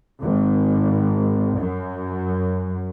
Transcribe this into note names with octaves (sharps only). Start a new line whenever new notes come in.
G#1
F#2